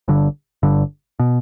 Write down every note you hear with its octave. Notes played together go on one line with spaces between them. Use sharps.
G1 G2 D3
G1 G2 D3
B2